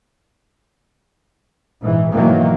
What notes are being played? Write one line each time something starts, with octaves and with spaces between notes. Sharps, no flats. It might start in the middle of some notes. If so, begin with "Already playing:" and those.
A#1 G#2 E3
G#2 B2 D#3 E3 F#3 A#3